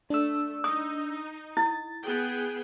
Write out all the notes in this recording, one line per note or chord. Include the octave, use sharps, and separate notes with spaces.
A3 D4 E6
D#4 D#6
E4 A6
B3 G#4 G5